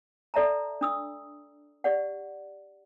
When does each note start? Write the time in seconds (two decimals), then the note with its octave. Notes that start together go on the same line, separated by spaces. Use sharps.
0.34 A4 D5 E5 A5 A#5
0.81 D4 D#6 E6
1.84 G4 D5 F#5